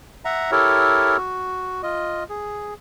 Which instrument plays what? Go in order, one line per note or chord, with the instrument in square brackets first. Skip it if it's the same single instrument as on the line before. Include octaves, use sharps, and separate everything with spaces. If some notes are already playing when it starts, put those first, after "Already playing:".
[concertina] E5 F#5 A#5
E4 G4 A4 A#4 C#5
F#4
F4 D#5
G#4